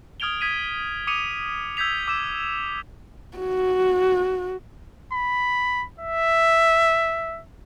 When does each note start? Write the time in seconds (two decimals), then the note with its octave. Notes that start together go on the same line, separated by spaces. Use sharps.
0.20 D#6 F6 G#6 D7 F7 G7
0.41 D#6 G#6 B6 D#7
1.07 D6 D#6 C#7 D#7 F7
1.77 E6 G6 G#6 B6 F7
2.07 D6 E6 E7
3.38 F#4
5.13 B5
6.00 E5